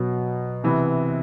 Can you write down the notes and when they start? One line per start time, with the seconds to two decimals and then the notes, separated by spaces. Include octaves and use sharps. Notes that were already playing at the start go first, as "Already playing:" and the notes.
Already playing: B2 F#3 B3
0.64 C3 E3 B3